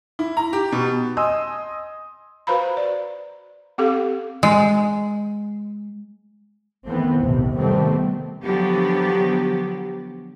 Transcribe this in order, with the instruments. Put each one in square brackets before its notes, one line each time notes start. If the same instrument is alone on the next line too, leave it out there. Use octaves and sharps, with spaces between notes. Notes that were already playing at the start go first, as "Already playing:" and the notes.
[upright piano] E4
A#5
G4
B2
[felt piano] D#5 G#5 C6 D#6 E6
[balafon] F#4 B4 C5 F5 A#5 B5
D5
C4 G4 A4 F5
[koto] G#3
[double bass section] D#3 E3 A3 B3 C4
A#1 D#2 G#2 C3
C3 D#3 G3 A3 B3 C4
[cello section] D3 F3 F#3 B3 G4